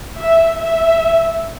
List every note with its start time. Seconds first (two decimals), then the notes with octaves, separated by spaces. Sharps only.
0.19 E5
0.59 E5